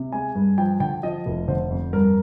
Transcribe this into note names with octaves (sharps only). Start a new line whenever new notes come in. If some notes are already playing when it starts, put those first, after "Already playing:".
Already playing: C3
G#3 G#5
G2
F3 G5
D3 G5
F3 D#5
F1
D3 C5
F2
G2 A#4